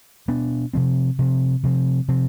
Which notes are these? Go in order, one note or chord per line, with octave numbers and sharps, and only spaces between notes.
B2 B3 D4
C3 F3 C4
C3 F3 C4
C3 F3 C4
C3 F3 C4